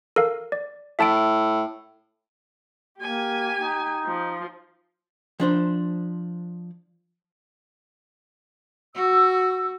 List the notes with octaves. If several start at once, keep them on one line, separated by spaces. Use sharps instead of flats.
A4 A#4 F5
D5
A2 E5 A5 D7
A#3 G4 G#5
D#4
F3
F3 D4 C5
F#4 E6